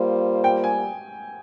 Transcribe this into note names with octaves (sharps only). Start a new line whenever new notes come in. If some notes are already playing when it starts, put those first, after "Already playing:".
Already playing: G3 A#3 F4 C5
G5
G#5